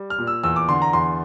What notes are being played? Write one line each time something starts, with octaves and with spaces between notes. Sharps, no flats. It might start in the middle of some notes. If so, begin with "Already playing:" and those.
Already playing: G3
F6
A#2
E6
E2 E6
D6
D3 C6
A#5
E2 C6